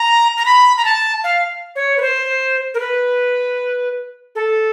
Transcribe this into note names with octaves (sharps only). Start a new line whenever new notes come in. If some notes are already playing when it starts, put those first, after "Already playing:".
Already playing: A#5
A#5
B5
A#5
A5
F5
C#5
B4
C5
A#4
B4
A4